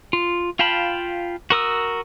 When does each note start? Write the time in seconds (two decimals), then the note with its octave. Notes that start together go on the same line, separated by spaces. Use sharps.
0.13 F4
0.59 F4 F5 G5 A5 B5
1.50 F#4 A#4 D#6 E6